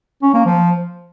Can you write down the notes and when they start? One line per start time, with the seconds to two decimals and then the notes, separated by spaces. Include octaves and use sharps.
0.23 C#4
0.34 A#3
0.46 F3